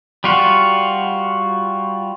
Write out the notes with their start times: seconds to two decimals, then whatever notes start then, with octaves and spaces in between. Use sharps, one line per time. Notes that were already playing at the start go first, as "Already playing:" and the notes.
0.24 G3 F4 F#4